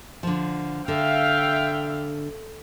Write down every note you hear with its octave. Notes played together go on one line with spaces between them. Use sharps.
D3 F3
D3 E5 F5 G5